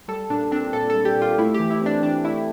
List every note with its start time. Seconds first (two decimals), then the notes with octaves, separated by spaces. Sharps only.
0.08 G3 A4
0.30 A#2 D4
0.51 C4 D4
0.73 A#2 A4
0.90 A4
0.95 G3
1.05 G4
1.16 A#2
1.22 F4
1.38 A3 E4
1.54 G4
1.60 E3
1.70 E4
1.81 C4 D4
2.02 E3 D4
2.25 A3 E4